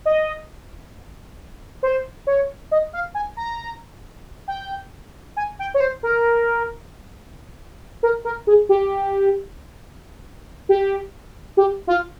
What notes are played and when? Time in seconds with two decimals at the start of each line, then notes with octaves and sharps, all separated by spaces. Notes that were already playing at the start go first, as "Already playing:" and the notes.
0.06 D#5
1.83 C5
2.27 C#5
2.71 D#5
2.93 F5
3.15 G#5
3.37 A#5
4.48 G5
5.37 G#5
5.59 G5
5.74 C#5
5.80 C5
6.03 A#4
8.03 A#4
8.25 A#4
8.47 G#4
8.69 G4
10.69 G4
11.57 G4
11.87 F4